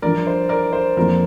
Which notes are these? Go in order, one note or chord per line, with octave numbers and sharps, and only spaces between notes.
G2 F3 D4 F4 A#4 D5
C5
A#4 D5
C5
F2 F3 A#3 D4 F4 A#4